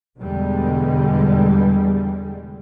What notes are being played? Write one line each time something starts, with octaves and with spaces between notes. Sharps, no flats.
E2 B2 D3 G3 G#3